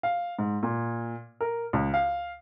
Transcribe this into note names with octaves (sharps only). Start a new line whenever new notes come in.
F5
G#2
A#2
A#4
C#2
F5